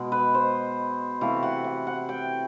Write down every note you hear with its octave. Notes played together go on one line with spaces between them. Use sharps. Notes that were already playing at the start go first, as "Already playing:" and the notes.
Already playing: B2 G#3
B4
C5
C3 E3 A3 F5
F#5
F#5
F#5
G5